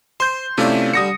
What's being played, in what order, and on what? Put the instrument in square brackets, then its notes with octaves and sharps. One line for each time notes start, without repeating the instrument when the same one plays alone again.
[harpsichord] C5 [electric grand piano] C6 G6
[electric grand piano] C3 A3 C#4 [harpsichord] E4 F4 D5
[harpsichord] D3 G3 [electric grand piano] D#6 A#6 C#7